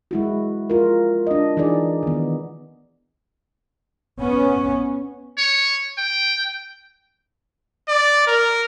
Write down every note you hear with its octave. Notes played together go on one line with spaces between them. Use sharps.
G#3 E4 F#4
F4 A#4
D4 D#5
E3 D4 D#4 G#4 D5
D#3 B3
B3 C#4
C#5
G5
D5
A#4